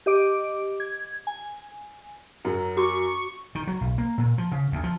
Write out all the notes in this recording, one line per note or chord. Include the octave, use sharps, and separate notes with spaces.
G4 D#5 D6 D7
G#6
G#5
F#2 F#3
F#4 C#6 D6
D#3
F#3
B1
A#3
A#2
F3
C#3
D2
F3